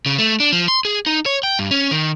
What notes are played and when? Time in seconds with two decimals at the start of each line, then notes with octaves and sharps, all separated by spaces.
0.06 C#3
0.18 A3
0.40 D4
0.52 F3
0.68 C6
0.85 G#4
1.06 D#4
1.26 C#5
1.43 G5
1.59 G2
1.71 C#4
1.91 D#3